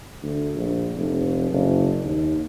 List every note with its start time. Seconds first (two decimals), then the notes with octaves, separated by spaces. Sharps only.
0.22 D2
0.55 A#1
0.96 F1
1.52 F#1
2.04 D#2